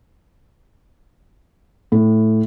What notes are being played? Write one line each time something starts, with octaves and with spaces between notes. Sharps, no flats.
A2